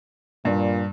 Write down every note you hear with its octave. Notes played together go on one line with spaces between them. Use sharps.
G2 A#2